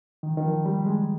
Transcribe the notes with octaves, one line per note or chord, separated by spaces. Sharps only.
D#3
D#3
F3
G3
G#3